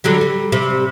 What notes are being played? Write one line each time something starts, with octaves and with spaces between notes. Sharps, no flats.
D3 F#3 G3
G3
C3 G3